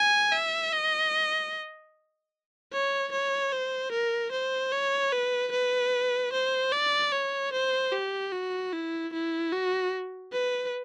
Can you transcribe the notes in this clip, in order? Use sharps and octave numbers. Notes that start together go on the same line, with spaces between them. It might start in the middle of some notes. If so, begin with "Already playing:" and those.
Already playing: G#5
E5
D#5
C#5
C#5
C5
A#4
C5
C#5
B4
B4
C5
D5
C#5
C5
G4
F#4
E4
E4
F#4
B4